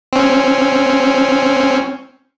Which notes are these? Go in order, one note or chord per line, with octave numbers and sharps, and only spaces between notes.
C4 C#4